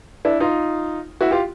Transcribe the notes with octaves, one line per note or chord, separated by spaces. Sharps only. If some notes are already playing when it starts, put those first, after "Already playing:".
D4 E4
D#4 F4
E4 F#4
F4 G4